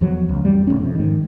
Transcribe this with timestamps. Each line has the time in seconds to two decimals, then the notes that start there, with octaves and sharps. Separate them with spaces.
0.01 E2 F3 F#3
0.29 C#2
0.45 A1 F2 G3
0.67 F1 A#1 A2 C#4
0.81 F2 C3
0.95 G#2 D#3